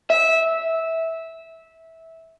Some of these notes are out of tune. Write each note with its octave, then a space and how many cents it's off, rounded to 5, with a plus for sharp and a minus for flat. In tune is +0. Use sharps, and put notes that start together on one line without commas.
E5 -15